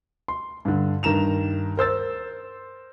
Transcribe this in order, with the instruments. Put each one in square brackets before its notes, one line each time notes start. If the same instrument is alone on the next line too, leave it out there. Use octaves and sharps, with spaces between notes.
[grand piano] C6
G2 D3
G2 D#3 A#5 E7 F7
A#4 C5 E6 A6